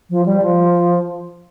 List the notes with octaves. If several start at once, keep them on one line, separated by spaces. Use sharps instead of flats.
F3
G3
F3